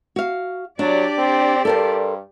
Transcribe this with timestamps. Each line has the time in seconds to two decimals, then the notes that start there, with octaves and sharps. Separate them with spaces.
0.16 F#4 F5
0.79 F#3 D4 G4 D5
1.18 C4
1.65 G2 A4 A#4 C5